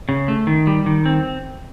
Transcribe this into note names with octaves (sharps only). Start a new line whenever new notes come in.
C#3
A3
D#3
G3
D#3
C4